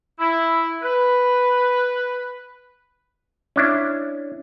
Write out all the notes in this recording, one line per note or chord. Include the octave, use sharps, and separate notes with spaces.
E4
B4
C#4 D4 E4